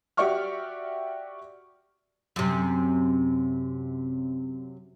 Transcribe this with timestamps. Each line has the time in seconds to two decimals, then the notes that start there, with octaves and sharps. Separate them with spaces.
0.17 F#4 G4 D5 E5 C#6 F6
2.36 F#2 C3